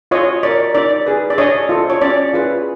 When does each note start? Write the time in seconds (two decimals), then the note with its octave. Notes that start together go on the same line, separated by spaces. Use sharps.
0.11 F4 C#5 D#5
0.43 A#4 C#5 D5
0.75 D#4 D5
1.06 G#4 B4
1.30 D5
1.38 D4 C#5 D#5
1.69 F4 A4 C5
1.90 C#5
2.02 C#4 D5
2.33 F4 G#4 B4